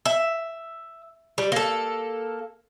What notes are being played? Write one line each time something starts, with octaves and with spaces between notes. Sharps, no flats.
E5
G3
A#3 A4